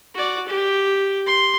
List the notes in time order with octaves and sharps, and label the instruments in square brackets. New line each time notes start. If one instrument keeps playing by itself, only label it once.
[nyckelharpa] F#4 D5
G4
C6